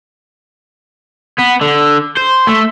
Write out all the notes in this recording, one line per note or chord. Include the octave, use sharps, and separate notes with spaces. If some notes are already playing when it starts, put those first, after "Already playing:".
B3
D3
C5
A3